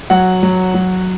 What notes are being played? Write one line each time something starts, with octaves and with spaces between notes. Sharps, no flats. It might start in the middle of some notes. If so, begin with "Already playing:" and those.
F#3 F#5
F#3
F#3